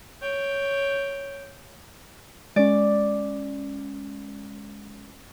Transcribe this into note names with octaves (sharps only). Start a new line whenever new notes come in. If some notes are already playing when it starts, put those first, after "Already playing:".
C#5 G5
G#3 C#4 D5